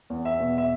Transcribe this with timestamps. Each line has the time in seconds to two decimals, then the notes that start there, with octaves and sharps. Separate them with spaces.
0.10 E2
0.25 E5
0.40 B2
0.58 E5